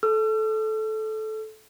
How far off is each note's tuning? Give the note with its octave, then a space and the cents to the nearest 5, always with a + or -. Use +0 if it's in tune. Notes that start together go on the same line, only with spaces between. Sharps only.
A4 -15 E6 +45